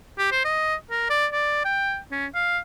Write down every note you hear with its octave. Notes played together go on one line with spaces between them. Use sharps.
G4
C5
D#5
A#4
D5
D5
G5
C#4
F5